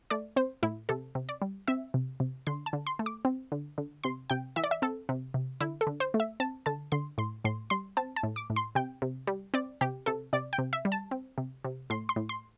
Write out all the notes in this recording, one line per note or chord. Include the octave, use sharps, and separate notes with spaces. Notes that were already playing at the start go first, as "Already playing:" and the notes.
A3 D5
C4 C5
A2 E4
C3 A4
C3
D5
G3
C4 E5
C3
C3
D3 C6
A5
D3
C6
A3
D6
C4
D3
D3
C3 C6
C3 G5
E3 E5
D5
E5
C4 A4
C3
C3
D3 E4
A4
D3
C5
A3
E5
C4 A5
D3 A5
D3 C6
A2 C6
A2 C6
G3 C6
C4 A5
A5
A2
D6
A2
C6
C3 G5
C3
G3
C4 D5
C3 G4
C3 A4
C3 D5
G5
C3
E5
G3
A5
C4
C3
C3
A2 C6
C6
A2
C6